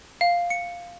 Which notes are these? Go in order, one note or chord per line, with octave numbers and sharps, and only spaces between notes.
F5
C#7